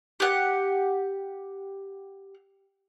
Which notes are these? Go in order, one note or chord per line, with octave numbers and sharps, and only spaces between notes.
G4 F#5